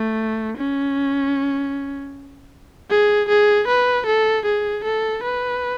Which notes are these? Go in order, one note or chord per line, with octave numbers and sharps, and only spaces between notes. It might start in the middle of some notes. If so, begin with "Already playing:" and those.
Already playing: A3
C#4
G#4
G#4
B4
A4
G#4
A4
B4